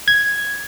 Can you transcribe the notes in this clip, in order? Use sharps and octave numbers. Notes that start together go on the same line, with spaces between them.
G#6